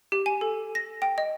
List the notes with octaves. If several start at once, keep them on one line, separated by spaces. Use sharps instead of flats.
G4
G#5
A4
A#6
G5
D#5